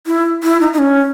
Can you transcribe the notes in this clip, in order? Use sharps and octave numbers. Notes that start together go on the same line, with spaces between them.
E4
E4
D#4
D#4
C#4